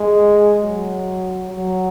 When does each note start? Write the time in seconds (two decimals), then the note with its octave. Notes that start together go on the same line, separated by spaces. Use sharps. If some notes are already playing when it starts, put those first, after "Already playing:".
Already playing: G#3
0.62 F#3
1.50 F#3